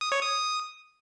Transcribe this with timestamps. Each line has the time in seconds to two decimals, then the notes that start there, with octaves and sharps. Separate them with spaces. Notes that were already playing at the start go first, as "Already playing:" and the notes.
0.01 D#6
0.12 C#5
0.22 D#6